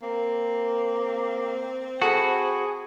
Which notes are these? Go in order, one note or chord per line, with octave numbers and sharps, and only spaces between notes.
A#3 C4
F#4 G#4 A4 F#5 B5